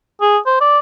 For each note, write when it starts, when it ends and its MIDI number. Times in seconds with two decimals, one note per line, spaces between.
0.21 0.38 68
0.47 0.60 72
0.61 0.79 74